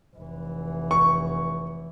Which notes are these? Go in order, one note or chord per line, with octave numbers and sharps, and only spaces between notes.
F1 E3
C#6